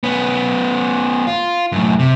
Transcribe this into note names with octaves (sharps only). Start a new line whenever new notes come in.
B3 C#4
F4
F#2 A2
C3